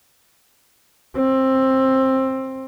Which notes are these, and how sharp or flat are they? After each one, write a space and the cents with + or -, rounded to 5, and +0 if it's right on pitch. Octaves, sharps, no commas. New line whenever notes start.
C4 +15